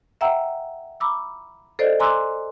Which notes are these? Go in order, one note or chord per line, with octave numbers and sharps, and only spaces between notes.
E5 F#5 G5 A#5 E6
A#5 B5 D6 E6
A4 C5 D5 D#5
G#5 A#5 C6 D6 E6 F#6